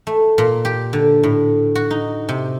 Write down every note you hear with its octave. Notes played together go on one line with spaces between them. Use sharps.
A3
A#2
G4
D3
A2
F#4
D#4
C3